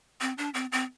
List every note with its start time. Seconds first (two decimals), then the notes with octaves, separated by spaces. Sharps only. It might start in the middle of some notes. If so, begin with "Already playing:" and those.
0.21 C4
0.38 D4
0.54 C4
0.72 C4